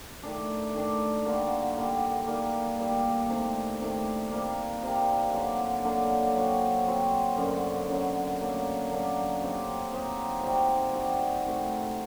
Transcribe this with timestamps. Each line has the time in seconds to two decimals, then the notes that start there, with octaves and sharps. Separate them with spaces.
0.23 D#3 A3 D4
0.74 D#3 A3 D4
1.25 D3 G3 A#3 F#4
1.76 D3 G3 A#3 F#4
2.27 D#3 G3 A#3
2.78 D#3 G3 A#3
3.29 C3 D#3 A3 D4
3.80 C3 D#3 A3 D4
4.32 C3 G3 A#3
4.83 C3 G3 A#3
5.33 D3 F#3 A#3 D4
5.84 D3 F#3 A#3 D4
6.35 F#3 C4 F#4
6.86 F#3 C4 F#4
7.37 F#2 D3 F#3
7.89 F#2 D3 F#3
8.40 F#3 A#3 D4
8.90 F#3 A#3 D4
9.40 F#3 C4 D#4 G4
9.93 F#3 C4 D#4 G4
10.43 C3 G3 C4 F#4
10.93 C3 G3 C4 F#4
11.45 D#3 A3 C4 F#4